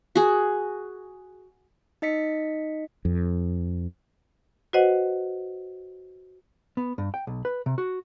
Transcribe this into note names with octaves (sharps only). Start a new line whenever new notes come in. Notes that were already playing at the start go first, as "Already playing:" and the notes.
F#4 G#4
D#4 D#5 B6 C#7
F2
F#4 B4 C5 D#5 F#5
B3
G2
G5
B1
B4
C3
F#4